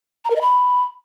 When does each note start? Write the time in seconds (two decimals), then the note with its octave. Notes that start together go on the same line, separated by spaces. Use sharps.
0.25 A#5
0.30 A#4
0.36 D#5
0.41 B5